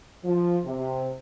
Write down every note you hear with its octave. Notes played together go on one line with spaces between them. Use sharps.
F3
C3